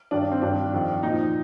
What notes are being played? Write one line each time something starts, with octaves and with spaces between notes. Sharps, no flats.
G2 D#3 D4
D4
C4
G2 D#3 D4
F2 D#3
A#2 F3 D#4